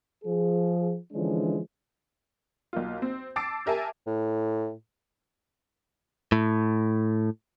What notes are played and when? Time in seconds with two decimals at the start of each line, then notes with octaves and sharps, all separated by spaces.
0.25 F3 G#4
1.13 D3 E3 F3 G#3 C#4 D4
2.73 B1 A#3 F4
3.02 C4
3.36 A5 D6 E6 A6 C7 D7
3.66 G4 A#4 E5 G#5 A5
4.07 A2
6.32 A2